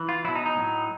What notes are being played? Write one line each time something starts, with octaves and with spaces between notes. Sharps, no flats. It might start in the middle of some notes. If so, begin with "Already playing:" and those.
Already playing: E3
F4
B2 F#3 E4
D#4
D#4
A2 F#3